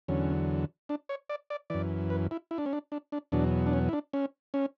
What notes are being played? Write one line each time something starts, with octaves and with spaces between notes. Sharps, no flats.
E2 D3 F#3 C#4
D4
C#5
D5
D5
F#2 E3 D5
B4
E4
E4
D4
C#4
D4
D4
D4
E2 B2 F#3 D4
D4
C#4
E4
D4
C#4
C#4